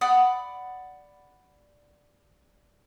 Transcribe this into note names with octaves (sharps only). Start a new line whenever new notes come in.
D5 F#5 B5 D#6